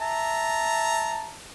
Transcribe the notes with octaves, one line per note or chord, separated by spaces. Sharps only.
E5 A5 A#5